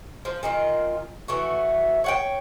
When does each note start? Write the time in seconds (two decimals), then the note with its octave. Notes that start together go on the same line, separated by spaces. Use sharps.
0.25 F3
0.43 A#2 D#3 F4
1.28 E3 A3 F#4
2.04 C#5 F#5 G5